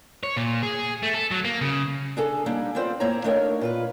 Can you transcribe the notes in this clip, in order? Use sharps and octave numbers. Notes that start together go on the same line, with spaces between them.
C#5
A#2
G#4
A3
A4
F#3
A#3
C#3
D4 G#4 A4
G3 A#3 D4 D#4
B3 C4 F4 C5 D5
A2 A#3 C4 C#5 A#5
A3 D4 D#4 A#4 C#5 F5
A#2 F4 B4